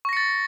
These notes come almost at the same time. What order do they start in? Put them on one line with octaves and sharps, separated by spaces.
C#6 A#6 C#7 A6